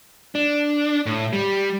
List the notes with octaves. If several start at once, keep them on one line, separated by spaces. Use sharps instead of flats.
D4
A2
G3